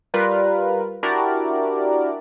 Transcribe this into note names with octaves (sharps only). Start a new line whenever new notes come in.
G3 F4 A#4 B4
D4 E4 F#4 G4 A#4 D5